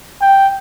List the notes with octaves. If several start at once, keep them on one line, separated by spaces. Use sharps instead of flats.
G5